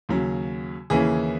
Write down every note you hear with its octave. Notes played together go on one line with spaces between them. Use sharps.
D#2 C#3 F#3
D#2 C#3 E3 A#3 C#4 G#4